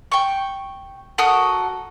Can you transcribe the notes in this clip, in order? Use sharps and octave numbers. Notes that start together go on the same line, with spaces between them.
G5 C#6
F#4 A4 A#4 D#6